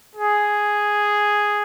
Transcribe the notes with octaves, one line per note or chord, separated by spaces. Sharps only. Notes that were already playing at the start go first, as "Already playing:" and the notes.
G#4